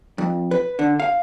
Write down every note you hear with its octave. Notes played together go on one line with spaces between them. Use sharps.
F2
B4
D3
F5